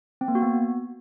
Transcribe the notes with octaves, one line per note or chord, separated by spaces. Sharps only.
C4
A#3
F#4
B3